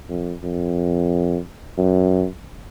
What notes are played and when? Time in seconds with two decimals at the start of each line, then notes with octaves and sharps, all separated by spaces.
0.09 F2
0.43 F2
1.78 F#2